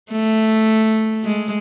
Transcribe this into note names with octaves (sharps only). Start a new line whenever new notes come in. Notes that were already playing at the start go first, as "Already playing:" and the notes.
A3
G#3